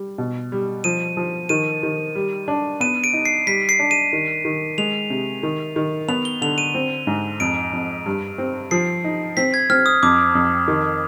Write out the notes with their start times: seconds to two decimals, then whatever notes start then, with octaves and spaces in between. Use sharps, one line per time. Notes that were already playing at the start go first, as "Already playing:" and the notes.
Already playing: G3
0.18 B2
0.52 G3
0.84 F3 D#7
1.17 F3
1.49 D#3 D#7
1.83 D#3
2.15 G3
2.48 D4
2.81 B3 D#7
3.04 D7
3.13 D#4
3.25 C7
3.47 G3 B6
3.69 C7
3.79 D4
3.91 D#7
4.13 D#3
4.45 D#3
4.78 G#3 F7
5.10 C3
5.43 D#3
5.76 D#3
6.09 B3 F7
6.25 G7
6.42 D3 F7
6.58 D#7
6.75 C4
7.07 G#2
7.40 F2 D7
7.73 F2
8.06 G2
8.38 C4
8.71 F3 C7
9.04 D#4
9.37 C4 B6
9.54 G#6
9.70 C4 F6
9.86 D#6
10.03 F2 D6
10.35 F2
10.68 D#3